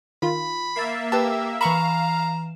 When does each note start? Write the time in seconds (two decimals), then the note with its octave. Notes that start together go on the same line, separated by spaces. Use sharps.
0.22 D#3 F4 B5
0.76 A#3 E5 A6 C7
1.12 G4 B4 A5 E6
1.61 E3 F5 A#5 B5 C#6 E7